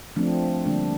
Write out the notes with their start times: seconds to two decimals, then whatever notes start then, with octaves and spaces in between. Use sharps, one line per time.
0.16 F3 A3 C4 D4
0.66 D3 G3 A#3 D4